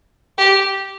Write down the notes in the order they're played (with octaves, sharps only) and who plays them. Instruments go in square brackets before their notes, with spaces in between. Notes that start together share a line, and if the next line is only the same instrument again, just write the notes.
[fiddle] G4